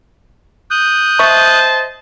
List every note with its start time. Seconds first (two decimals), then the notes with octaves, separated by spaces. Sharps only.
0.71 D#6 F#6 G6
1.19 C5 D#5 E5 A5 C#6